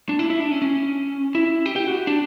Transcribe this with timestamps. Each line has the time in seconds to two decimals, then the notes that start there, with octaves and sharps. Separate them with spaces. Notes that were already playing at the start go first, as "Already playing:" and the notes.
0.09 D4
0.19 E4
0.30 E4
0.40 D4
0.51 C#4
0.62 C#4
1.35 E4
1.66 G4
1.76 G4
1.87 F#4
2.07 D4